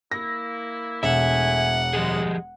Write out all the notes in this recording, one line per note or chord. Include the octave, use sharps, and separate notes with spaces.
A#3 E4 A#6
E1 A3 E5 F#5 G#5
F3 G#3 G4 G#4